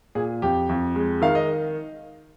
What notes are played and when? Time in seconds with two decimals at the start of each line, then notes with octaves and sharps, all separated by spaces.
0.15 A#2 G#4
0.42 F2 G4
0.69 F2
0.96 G#3
1.22 D#3 F5
1.35 D#5